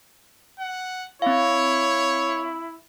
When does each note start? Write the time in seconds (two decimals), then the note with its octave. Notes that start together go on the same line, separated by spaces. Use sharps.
0.59 F#5
1.22 C4 E4 C#5 F5